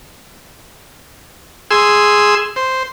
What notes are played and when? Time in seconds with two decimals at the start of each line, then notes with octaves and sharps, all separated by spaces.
1.71 G#4 C6 E6
2.56 C5